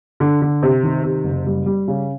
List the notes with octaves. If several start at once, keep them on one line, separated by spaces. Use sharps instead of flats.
D3
D3
C3
D#3
C3
F#1
G3
G3
C#3